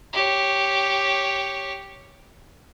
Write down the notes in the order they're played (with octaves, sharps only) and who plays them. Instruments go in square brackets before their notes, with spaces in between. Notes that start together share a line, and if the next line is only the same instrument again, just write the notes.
[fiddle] G4 C#5